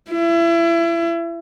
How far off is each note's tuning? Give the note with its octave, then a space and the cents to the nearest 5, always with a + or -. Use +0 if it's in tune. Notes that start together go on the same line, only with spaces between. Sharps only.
E4 +30